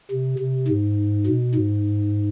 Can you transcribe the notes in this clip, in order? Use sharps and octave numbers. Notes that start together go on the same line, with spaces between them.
C3
C3
G#2
B2
G#2